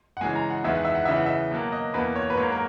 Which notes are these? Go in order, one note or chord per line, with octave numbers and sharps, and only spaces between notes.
F#5
C#3 E3 G#3 G#5
A#5
F#5
E2 D#3 G#3 B3 E5
F#5
E5
F#5
C#3 E3 B3 E5
F#5
E5
B2 F#3 A#3
D#5
E2 B2 A#3 B4
C#5
B4
G#2 F#3 A#3 C#5
A#4